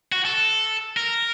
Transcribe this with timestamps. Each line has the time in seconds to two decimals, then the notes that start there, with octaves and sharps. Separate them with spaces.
0.12 F#4
0.25 A4
0.97 A#4